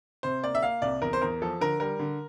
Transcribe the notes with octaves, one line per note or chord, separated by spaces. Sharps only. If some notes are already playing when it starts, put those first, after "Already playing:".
C3 C5
A#3 D5
E5
A#3 F5
C2 D5
E2 A#4
C5
E2 A#4
F3 A4
D3 A#4
G3 A#4
D3